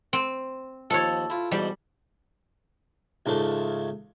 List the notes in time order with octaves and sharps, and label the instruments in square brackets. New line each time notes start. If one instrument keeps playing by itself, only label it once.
[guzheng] C4
[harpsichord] D#2 F3 [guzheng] A4 C#5
[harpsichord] E4 F4
[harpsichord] G#2 B2 E3 [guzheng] G3
[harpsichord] C#2 G#2 C#3 A3